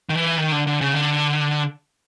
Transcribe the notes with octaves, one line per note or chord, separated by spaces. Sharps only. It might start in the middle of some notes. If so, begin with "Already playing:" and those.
D#3
E3
D#3
D3
D3
C#3
D3